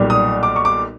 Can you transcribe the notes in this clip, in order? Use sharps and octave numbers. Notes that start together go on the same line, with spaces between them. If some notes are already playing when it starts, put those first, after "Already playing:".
Already playing: B1 A#2 G3
D#6
D6
C#6
D6